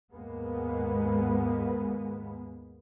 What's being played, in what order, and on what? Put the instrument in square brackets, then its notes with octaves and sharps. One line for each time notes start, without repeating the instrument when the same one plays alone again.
[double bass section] D#2 G#2 G#3 A#3 B3